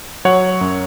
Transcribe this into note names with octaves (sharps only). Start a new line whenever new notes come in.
F#3 C#5 F#5
F#2